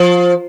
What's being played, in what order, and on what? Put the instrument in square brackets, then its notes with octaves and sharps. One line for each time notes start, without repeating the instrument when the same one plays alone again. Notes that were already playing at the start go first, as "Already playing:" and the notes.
Already playing: [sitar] F3